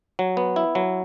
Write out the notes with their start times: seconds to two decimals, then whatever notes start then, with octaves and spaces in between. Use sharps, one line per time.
0.19 F#3
0.37 B3
0.56 E4
0.75 F#3